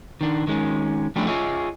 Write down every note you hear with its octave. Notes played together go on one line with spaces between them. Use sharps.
D#3 D4
D#3 G#3 C#4
F3 G3 A3 C#4 D4 E4
F4 G#4 C#5 D#5 E5